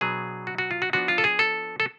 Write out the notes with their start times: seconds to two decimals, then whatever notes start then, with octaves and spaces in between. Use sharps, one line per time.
0.01 B2 F#3 B3 D4 G#4
0.47 F#4
0.58 F#4
0.71 F4
0.82 F#4
0.93 F3 B3 D4 F#4
1.08 F4
1.18 A4
1.24 G#4
1.39 A4
1.80 A4